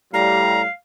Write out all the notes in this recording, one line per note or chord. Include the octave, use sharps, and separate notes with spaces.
A2 G3 F5 A#5